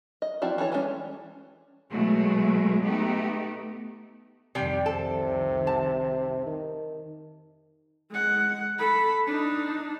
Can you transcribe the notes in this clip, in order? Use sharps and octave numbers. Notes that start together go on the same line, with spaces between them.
D#5
F3 C4 E4 F#4 D5
E3 D4 A4 C#5
E3 G3 G#3 B3 C#4
B2 F#3 G#3 A3
A3 B3 D#4 G4
C2 F2 C3 D#3 G3 G5
C3 A4
A5
D#3
G#3 F#5
A4 B5
D4 D#4